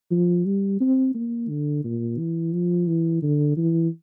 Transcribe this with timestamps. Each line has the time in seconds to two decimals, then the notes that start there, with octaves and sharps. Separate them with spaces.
0.11 F3
0.45 G3
0.80 C4
1.14 A#3
1.49 D3
1.84 A#2
2.18 E3
2.53 F3
2.87 E3
3.22 D3
3.57 E3